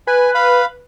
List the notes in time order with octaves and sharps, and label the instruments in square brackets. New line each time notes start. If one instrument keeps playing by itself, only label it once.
[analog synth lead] B4 [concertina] G#5
[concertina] F5 B5